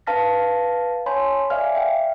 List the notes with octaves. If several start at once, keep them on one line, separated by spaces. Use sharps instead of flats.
B4 F5 A5 F6 A#6 B6
C#5 G#5 A5 B5 C6 G6
D5 E5 F5 G#5 F6
E5 G5